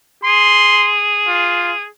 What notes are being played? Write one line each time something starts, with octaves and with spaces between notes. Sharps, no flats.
G#4 C6
F4